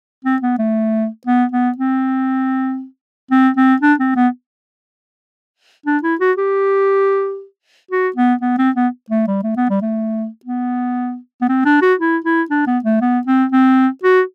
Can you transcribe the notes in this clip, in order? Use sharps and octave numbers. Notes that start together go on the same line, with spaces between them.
C4
B3
A3
B3
B3
C4
C4
C4
D4
C4
B3
D4
E4
F#4
G4
F#4
B3
B3
C4
B3
A3
G3
A3
B3
G3
A3
B3
B3
C4
D4
F#4
E4
E4
D4
B3
A3
B3
C4
C4
F#4